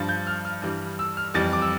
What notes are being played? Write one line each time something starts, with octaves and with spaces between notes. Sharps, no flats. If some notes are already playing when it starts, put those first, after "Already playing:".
Already playing: G2 F3 A6
G6
F6
F6
G2 E3 G3
E6
F6
F2 E3 G3 A6
D6
E6